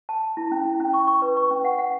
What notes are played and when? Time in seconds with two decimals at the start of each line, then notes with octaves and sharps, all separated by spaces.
0.09 A5
0.23 A5
0.37 E4
0.52 C#4
0.65 E4
0.80 C#4
0.93 C#6
1.07 C#6
1.22 B4
1.37 C#6
1.51 C#4
1.64 F#5
1.78 F#5